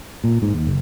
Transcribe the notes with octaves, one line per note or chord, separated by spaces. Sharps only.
A#2
G#2
D#2
F#1